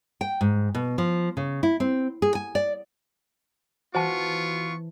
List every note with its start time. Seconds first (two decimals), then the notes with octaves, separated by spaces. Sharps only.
0.21 G5
0.41 G#2
0.75 B2
0.98 F3
1.37 C#3
1.63 E4
1.80 C4
2.22 G#4
2.35 G#5
2.55 D5
3.95 E3 B3 F4 F#4 C5 A5 C#6